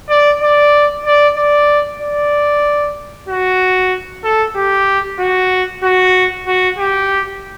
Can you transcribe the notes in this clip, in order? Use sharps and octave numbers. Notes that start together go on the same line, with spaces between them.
D5
D5
D5
D5
D5
F#4
A4
G4
F#4
F#4
F#4
G4